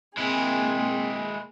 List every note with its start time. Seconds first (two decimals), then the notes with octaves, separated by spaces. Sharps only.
0.17 G#3 A#3 C4 E4 G#4